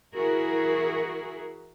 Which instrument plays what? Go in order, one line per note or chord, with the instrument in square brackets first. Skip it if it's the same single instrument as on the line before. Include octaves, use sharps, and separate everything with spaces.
[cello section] E3 E4 F#4 G#4 A#4